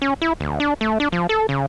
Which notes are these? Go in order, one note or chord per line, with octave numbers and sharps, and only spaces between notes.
C#4
E4
D2
D4
A3
D4
F3
A4
C#3